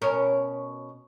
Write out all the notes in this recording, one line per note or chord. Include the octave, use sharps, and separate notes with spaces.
B2 C#4 A#4